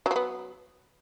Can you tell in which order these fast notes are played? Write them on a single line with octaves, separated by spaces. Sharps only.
F#3 F3 B3